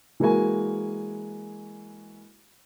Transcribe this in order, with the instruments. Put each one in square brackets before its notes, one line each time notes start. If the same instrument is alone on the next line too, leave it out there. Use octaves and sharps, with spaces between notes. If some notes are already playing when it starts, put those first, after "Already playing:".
[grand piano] E3 G#3 A#3 F#4 G#5